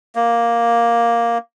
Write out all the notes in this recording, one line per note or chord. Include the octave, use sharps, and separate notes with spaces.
A#3